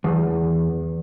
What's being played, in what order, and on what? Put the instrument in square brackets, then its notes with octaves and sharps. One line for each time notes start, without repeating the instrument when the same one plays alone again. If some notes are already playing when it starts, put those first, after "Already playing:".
[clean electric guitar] E2